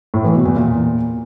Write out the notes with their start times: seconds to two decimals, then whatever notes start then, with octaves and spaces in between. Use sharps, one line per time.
0.14 A2
0.24 E3
0.35 B2
0.45 E2
0.56 A#2